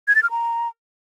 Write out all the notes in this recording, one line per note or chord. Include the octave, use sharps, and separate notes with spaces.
G#6
A6
F6
A#5